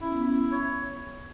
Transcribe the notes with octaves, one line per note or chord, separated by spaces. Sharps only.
C#4 E4
B3
C#4
E4
C#5